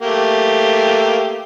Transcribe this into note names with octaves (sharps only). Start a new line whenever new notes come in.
A3 A#3 G4